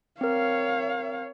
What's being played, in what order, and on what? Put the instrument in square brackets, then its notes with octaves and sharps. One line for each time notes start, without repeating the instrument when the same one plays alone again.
[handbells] C4 A#4 [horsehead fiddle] C#5 F5